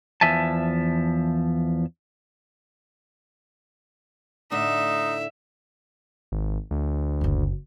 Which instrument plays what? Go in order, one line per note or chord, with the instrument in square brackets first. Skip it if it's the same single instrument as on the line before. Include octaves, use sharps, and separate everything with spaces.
[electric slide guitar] E2 F3 E5 G#5 A5
[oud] A2 D3 D4 [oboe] D#4 [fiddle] E5
[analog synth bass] G#1
D2
[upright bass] F#1 F#2